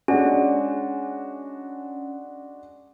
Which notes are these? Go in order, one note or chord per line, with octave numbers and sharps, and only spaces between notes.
G#3 C#4 D4 F#4